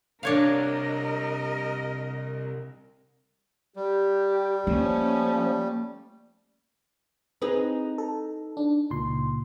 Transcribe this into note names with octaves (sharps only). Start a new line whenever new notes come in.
C2 D4 A#4 C#5 D#5 F5
G3 G4
F3 A3 A#3 C#4
C4 D#4 G#4 B4
A4
D4
C#2 A#2 C6